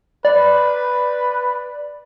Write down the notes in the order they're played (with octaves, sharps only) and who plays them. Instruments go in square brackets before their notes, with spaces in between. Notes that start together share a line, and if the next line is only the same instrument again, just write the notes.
[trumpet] B4 [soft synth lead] D5